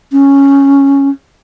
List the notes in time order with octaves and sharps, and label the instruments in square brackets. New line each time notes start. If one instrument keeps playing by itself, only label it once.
[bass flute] C#4